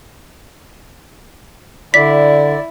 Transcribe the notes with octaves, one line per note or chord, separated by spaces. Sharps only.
D3 E4 D5 B6